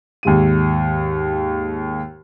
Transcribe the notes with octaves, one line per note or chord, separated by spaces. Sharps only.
D#2 G#2 D#7